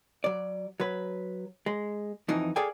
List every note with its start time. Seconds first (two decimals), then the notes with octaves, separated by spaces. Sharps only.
0.24 F#3 D5
0.80 F#3 B4
1.66 G#3
2.28 F2 E3 F3 D#4
2.56 G#4 A4 D5 F5 G5 G#5